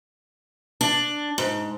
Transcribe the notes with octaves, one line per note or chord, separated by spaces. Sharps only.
D4
G#2